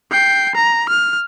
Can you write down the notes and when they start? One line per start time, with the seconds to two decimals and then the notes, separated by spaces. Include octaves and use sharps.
0.11 G5 C7
0.55 A#5
0.89 F6